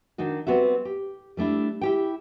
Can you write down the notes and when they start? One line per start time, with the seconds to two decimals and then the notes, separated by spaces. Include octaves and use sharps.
0.18 D#3 D4 D#4 F#4
0.47 G3 B3 C4 F#4 E5
0.85 G4
1.37 G3 A3 D4 E4
1.81 E4 G4 G5